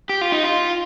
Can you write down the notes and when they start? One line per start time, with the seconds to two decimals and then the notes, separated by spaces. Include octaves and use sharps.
0.09 G4
0.21 F4
0.32 D#4
0.43 F4